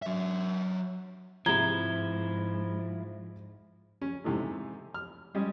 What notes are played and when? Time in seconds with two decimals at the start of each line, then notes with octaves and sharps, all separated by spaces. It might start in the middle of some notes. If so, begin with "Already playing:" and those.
0.02 F#3 E5
1.46 G#2 C3 F3 G#3 E4 A#5 G#6 G7
4.02 C#4
4.24 G#2 C3 E3 A3
4.94 F6
5.35 G3 G#3 C#4